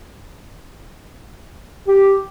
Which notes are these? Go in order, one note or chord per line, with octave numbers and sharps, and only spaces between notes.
G4